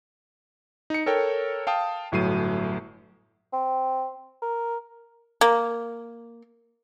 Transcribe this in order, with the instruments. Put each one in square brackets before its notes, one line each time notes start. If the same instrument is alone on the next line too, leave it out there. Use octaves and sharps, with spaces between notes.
[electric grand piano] D#4 C#7
A4 A#4 C#5 G5
F5 G5 A5 D#6
G1 A2 F#3 C7 D#7
[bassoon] C4
A#4
[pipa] A#3